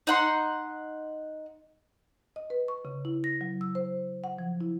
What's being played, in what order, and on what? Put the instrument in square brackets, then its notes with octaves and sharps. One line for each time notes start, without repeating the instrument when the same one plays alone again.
[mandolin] D#4 F#5 C6
[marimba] D#5
B4
C#6
C#3
E4
A#6
F#3
E6
C5
F#5
F3
E4